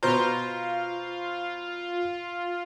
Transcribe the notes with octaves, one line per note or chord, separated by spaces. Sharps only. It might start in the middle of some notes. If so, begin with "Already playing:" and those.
B2 F4 C5 A#5